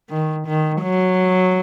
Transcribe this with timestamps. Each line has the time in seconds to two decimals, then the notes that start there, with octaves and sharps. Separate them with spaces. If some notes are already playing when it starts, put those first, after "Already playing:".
0.10 D#3
0.47 D#3
0.83 F#3